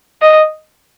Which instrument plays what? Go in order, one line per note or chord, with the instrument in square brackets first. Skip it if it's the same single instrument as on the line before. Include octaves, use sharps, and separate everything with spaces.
[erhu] D#5